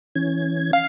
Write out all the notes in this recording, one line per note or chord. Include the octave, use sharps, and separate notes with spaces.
E3 C#4 G#6
F5